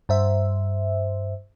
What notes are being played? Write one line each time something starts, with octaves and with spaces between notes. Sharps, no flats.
G2 C5 E5